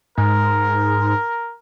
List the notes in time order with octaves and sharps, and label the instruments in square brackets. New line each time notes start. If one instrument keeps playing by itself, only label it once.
[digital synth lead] G#2 [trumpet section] A#4